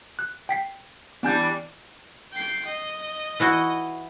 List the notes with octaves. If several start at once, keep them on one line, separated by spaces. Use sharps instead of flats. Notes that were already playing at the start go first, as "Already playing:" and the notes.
F#6
G5 B6 C7
E3 G3 B3 D4 G#5 G6
G5 C7
D#5
E3 E4 F#4